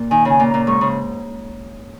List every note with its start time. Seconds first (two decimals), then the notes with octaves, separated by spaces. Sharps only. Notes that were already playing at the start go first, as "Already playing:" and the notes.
Already playing: A#2
0.10 D#3 G#5
0.25 C#3 G#5
0.40 A#2
0.48 A#5
0.54 A#2
0.67 G#2 C#6
0.81 C#3